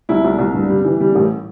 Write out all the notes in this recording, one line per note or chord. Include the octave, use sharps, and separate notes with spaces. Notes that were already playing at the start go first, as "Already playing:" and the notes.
C2 E4
C2
C2
G2
G3
E3
G3
A1